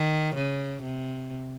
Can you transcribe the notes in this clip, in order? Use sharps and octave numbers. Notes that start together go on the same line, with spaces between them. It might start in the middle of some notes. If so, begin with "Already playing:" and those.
Already playing: D#3
C#3
C3